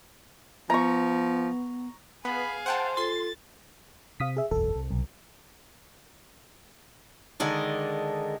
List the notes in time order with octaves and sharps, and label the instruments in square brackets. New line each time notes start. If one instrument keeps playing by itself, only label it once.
[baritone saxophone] F3 [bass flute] B3 [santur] A#5 C#6
[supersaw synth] B3 [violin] G#4 F5 [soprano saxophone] B5
[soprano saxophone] C5 [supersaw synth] F#5 G5 A5
[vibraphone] F4 A4 [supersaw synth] C6 [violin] A6
[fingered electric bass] C3 [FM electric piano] F5 D#6 B6
[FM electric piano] G#4 E5
[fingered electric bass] F#1 B1 E2 [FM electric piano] A4
[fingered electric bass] C2
[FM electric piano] B1
[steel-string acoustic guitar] D3 D#3 G#3 D4